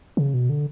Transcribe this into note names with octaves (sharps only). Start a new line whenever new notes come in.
C#3
B2
D3